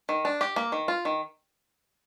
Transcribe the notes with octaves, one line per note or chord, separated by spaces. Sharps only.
D#3
D4
G4
A#3
D#3
F4
D#3